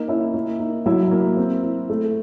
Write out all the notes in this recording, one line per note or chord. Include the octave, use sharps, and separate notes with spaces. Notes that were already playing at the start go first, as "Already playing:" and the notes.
Already playing: A#3 D#4 D#5
C#4 E4 E5
A#3
D#4
F#3 E4 E5
A#3
C4
E4
A3